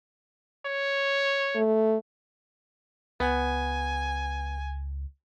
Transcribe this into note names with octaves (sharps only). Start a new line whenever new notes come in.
C#5
A3
C#2 B3 G#5